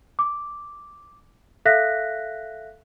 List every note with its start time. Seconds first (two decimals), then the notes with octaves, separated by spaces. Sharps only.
0.19 D6
1.65 A4 E5 F5 F#6 A#6 B6